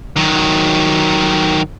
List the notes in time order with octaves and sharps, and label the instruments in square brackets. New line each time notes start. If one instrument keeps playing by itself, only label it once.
[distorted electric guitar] D#3 F#3